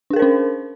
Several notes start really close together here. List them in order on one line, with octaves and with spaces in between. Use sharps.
D4 G#4 A#4 C5 C#4